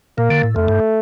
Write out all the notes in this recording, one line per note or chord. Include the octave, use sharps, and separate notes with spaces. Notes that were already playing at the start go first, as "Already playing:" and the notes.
A#2 A#3
D3
A2
F2 A3
G2